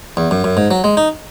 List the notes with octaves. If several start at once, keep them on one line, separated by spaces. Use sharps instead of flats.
E2
F#2
F#2
G#2
F#3
G#3
D#4